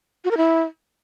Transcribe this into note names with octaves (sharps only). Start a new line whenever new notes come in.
F#4
A#4
E4